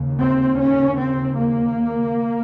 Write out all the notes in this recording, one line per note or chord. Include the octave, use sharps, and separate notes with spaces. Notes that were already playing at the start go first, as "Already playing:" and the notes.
Already playing: D#2 C#3
C4
C#4
C4
A#3